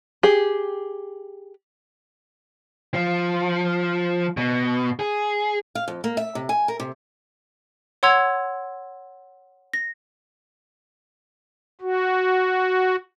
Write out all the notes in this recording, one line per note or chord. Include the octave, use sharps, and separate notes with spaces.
G4 G#4
F3
B2
G#4
F5
F2
A#3
E5
C3
G#5
A#4
C3
C#5 F#5 C6 E6 G#6 F7
A#6
F#4